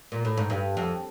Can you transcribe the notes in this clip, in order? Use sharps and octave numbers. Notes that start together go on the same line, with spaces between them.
A#2
A2
G#2
G2
F2